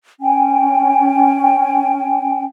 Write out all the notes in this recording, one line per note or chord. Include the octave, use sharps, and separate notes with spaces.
C#4 G5 G#5